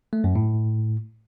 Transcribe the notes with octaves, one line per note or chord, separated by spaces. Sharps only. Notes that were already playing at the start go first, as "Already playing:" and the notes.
A3
F#2
A2